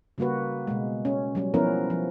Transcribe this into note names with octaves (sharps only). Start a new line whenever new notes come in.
C#3 G3 A#3 F#4 B4
B2 G#3
C#4
F#3 G3 C#4
F3 B3 C#4 E4 A#4 B4
F3